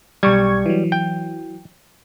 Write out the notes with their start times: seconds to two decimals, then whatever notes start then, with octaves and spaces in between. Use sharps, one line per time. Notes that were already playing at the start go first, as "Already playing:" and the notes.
0.23 B1 G3 C#6 G#6
0.66 E3 F#3
0.92 G5